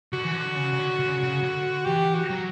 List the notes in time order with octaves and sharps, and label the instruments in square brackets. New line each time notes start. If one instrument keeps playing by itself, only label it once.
[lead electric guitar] D3 [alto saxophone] F#4
[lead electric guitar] E3
D3
D3
C#3
C#3
D3
D3
C#3
C#3
D3
[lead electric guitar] E3 [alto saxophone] G4
[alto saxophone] F#4
[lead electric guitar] F#3